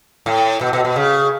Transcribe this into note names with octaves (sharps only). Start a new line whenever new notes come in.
A2
B2
B2
B2
C#3